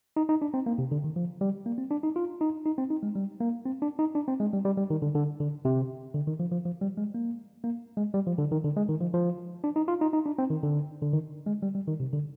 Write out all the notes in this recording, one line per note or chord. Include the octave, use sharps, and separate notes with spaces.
D#4
D#4
D4
C4
A#3
C3
D3
D#3
F3
G3
A#3
C4
D4
D#4
F4
D#4
D#4
C4
D#4
G#3
G3
A#3
C4
D4
D#4
D4
C4
G#3
G3
G3
G3
D#3
D3
D3
D3
C3
D3
D#3
F3
F3
F3
G3
G#3
A#3
A#3
G#3
G3
F3
D3
D#3
D3
G#3
D#3
F3
F3
D4
D#4
F4
D#4
D#4
D4
C4
D#3
D3
D3
D#3
G#3
G3
G3
D#3
C3
D3